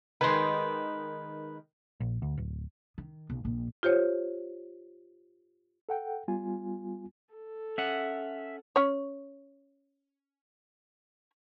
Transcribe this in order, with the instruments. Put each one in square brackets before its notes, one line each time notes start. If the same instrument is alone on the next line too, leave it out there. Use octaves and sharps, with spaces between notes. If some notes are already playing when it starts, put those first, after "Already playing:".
[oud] D#3 G#3 [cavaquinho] B4 C6
[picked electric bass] A#1
D2
D1
[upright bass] D#3
B1
A#1
[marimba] F4 G4 C5 C#5
[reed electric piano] A4 F#5 G5
G3 B3 F4 G#5
[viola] A4
[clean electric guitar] C#4 F#5 [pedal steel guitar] E5
[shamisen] C#4 C#5